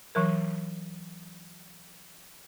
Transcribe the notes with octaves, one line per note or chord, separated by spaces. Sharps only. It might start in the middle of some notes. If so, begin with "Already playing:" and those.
E3 F#3 A#4